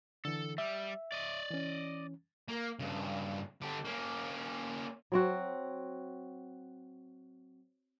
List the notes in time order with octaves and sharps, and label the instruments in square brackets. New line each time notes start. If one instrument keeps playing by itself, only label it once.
[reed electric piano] D3 E3 [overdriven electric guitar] A4
[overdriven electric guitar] G3 [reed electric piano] E5
[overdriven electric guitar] D5 D#5
[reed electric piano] E3 C#4
[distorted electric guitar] A#3
G2 C#3
D3 G4
A#3 C#4
[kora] F#3 C4 F#4